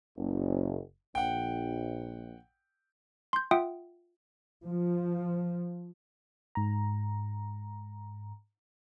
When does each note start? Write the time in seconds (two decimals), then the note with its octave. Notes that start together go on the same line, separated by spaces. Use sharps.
0.17 F#1
1.15 A#1 F#5 G5
3.33 C6 G6
3.51 F4 E5 F#5 G5 D#6
4.65 F3
6.55 G#2 A#5